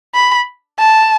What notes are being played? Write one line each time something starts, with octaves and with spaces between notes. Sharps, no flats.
B5
A5